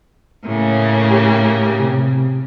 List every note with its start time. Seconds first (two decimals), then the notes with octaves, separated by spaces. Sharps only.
0.46 A2 C#3 A#3
1.10 G4
1.80 C3